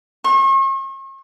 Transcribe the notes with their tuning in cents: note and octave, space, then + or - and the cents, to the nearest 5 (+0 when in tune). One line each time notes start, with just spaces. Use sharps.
C#6 -45